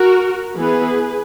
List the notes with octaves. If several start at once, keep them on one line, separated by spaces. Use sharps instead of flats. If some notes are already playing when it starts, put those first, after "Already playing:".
Already playing: F#4 A#4
E3 B3 G#4 B4